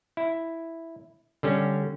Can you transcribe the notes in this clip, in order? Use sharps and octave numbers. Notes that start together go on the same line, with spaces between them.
E4
D3 G3 C#4